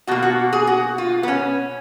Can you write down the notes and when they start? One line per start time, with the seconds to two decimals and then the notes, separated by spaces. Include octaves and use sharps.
0.07 B2 A#3 F#4
0.23 F#4
0.53 G#4
0.67 F#4
0.98 F4
1.23 B3
1.28 C#4